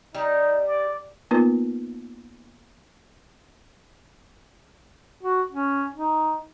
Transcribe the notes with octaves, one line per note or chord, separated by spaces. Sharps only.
G3 D#4
D5
A#3 B3 D#4 F4 A#4 B4
F#4
C#4
D#4